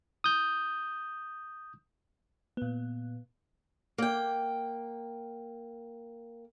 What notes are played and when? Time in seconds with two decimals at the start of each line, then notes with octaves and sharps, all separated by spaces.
0.24 D#6 G6
2.57 A#2 B3
3.98 A#3 G5